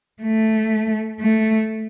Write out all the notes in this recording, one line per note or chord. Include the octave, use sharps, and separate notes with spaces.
A3
A3